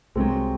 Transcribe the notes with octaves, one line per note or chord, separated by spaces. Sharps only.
C2 C3 F#3 G#3 C4